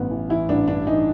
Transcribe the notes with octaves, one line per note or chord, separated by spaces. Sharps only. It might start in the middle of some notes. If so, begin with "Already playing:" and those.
Already playing: A1 G2 B3
E3
E3 E4
A1 D4
G2 D4
E3 D#4